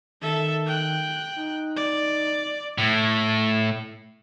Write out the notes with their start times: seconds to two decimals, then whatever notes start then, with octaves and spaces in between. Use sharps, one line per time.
0.22 D#3 A4 E5
0.66 G5 F#6
1.36 D#4
1.77 D5
2.78 A2